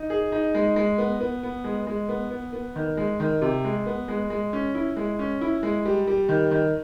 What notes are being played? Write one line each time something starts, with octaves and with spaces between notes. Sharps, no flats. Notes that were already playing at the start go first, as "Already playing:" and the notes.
Already playing: D#4
G#4
D#4
G#3
G#3
B3
B3
B3
G#3
G#3
B3
B3
B3
D#3
G#3
D#3
C3
G#3
B3
G#3
G#3
C#4
E4
G#3
C#4
E4
G#3
G3
G3
D#3
D#3